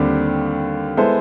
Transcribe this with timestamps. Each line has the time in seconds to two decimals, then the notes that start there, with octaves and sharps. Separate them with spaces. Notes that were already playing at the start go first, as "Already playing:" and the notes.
Already playing: D#2 D3 G3 C4
0.97 G#3 B3 E4 A4 C5